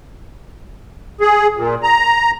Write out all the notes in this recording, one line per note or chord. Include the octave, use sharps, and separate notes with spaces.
G#4
A#2
A#5